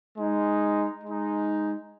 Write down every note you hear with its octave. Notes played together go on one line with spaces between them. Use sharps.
G#3 D#4
G#3 D#4